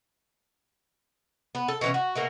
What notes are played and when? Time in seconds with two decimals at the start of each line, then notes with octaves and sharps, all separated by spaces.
1.55 B3
1.68 A4
1.81 B2 E3 C#4
1.94 F#4
2.16 B2 A3 A#3